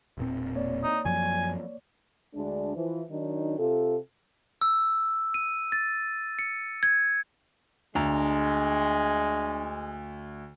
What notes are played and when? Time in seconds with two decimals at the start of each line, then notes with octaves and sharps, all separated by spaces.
0.18 E1 A#2 C4
0.55 A#3 C#5 D5
0.84 D#4
1.05 F#2 F3 F#3 G#5
2.35 D2 G#3 D4
2.76 E3 F3
3.10 D#3 F#3 D4 D#4
3.59 C3 F4 A4
4.61 E6
5.34 D#7
5.72 A6
6.39 C#7
6.83 G#6
7.95 D2 G#3 D4 A#5